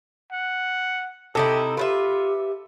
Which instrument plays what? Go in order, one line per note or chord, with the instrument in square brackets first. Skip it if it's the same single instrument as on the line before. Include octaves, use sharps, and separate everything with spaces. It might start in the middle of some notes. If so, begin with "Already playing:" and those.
[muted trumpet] F#5
[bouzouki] C3 D#4 E4 [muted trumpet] G4 [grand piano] A4
[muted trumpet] F4 [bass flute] G4 [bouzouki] B4 C5 E5